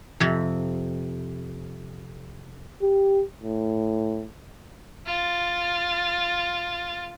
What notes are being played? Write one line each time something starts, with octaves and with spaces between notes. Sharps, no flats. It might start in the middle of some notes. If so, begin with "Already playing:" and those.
F2 C3
G4
A2
F4 A6